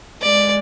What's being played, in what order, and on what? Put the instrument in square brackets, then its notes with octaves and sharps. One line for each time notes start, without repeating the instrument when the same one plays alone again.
[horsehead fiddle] G#3 [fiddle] D5